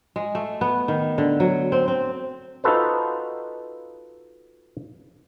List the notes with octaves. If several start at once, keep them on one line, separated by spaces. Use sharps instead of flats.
G#3
A3
B3
D#3
D3
F#3
C4
C4
D#4 F4 F#4 A4 B4 C5